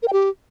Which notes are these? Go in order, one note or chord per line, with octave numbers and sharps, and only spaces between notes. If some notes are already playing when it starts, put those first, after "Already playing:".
A#4
G5
G4